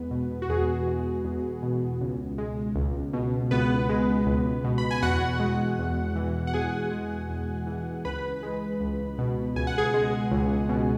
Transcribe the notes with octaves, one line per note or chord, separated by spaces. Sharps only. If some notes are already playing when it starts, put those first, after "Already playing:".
Already playing: E2 G#3 B3 B4
B2
F#4
E2 G#4
G#3
E2
B2
C#2
G#3
C#2
B2
C#2 B3 B4
G#3
C#2
B2
B5
G#5
E2 F#4 F#5
G#3
E2
E3
F#5
E2 G#4 G#5
G#3
E2
E3
C#2 B4 B5
G#3
C#2
B2
C#2 G#5
F#5
G#4 G#5
G#3
C#2
B2